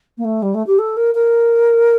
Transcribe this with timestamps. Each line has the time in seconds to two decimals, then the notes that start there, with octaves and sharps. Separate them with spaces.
0.18 A#3
0.24 A3
0.42 G3
0.54 A3
0.67 G4
0.79 A4
0.97 A#4
1.15 A#4